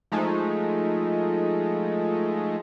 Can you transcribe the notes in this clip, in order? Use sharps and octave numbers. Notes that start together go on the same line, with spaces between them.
F3 G#3 A3 D#4